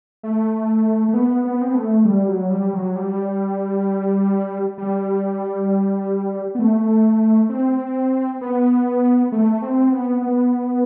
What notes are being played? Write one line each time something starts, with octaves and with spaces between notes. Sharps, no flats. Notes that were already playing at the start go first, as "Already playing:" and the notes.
A3
A3
B3
B3
C4
B3
A3
G3
F#3
G3
F#3
G3
G3
B3
A3
C4
B3
A3
C4
B3
B3